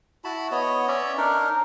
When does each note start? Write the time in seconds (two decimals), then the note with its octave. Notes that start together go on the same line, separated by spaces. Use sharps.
0.24 E4 F#4 A5 B5
0.52 B3 C#5 D#5
0.88 C#4 C#5 D5 E5
1.18 D4 D#4 A#4